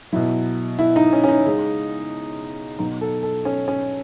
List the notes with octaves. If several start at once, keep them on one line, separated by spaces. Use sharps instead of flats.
B2 F#3 E4
E4
D#4
C#4
C#4
D#4
C#3 G#3
B2 F#3 D#4
A4
A4
C#4
C#4